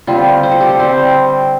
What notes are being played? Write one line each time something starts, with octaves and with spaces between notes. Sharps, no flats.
D3 G3 C4 F4
C5
A4
G4
A4
D3 G3 C4 C5